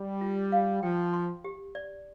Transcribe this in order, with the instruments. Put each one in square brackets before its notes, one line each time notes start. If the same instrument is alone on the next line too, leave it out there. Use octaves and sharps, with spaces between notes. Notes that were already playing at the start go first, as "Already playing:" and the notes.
Already playing: [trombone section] G3
[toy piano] F4
F5
[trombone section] F3 [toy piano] G5
[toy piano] C6
G4
D5